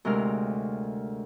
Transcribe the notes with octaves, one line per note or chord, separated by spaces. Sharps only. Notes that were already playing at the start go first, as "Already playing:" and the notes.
D2 C3 G#3 A#4 F6